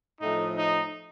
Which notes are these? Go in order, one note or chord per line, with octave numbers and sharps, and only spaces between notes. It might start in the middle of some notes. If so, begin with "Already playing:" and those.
A2 F3 A3 D#4
D#4